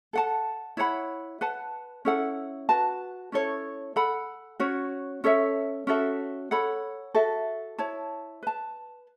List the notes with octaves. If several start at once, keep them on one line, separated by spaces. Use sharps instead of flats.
A4 F#5 A5
E4 C#5 F#5 B5
B4 F#5 A5
C#4 E4 A4 F#5
F#4 B4 A5
C#4 E4 A4 C#5
A4 F#5 B5
C#4 F#4 C#5
C#4 A4 C#5 E5
C#4 F#4 A4 E5
A4 C#5 F#5 B5
F#4 A4 E5
E4 C#5 A5
B4 A5